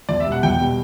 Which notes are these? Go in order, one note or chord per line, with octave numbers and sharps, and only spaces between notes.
E2 D5
E5
B2 G3
F#5
E2 G5
B2 G3